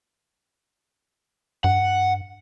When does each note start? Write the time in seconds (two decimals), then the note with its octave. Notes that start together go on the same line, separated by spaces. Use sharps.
1.64 G2 F#5